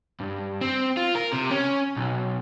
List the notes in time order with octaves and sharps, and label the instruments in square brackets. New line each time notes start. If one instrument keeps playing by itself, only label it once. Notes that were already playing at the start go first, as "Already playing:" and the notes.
[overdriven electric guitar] G2
C4
F4
A#4
C3
C#4
B1